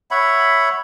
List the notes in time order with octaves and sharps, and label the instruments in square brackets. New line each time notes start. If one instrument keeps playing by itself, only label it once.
[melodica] C#5 E5 F#5 B5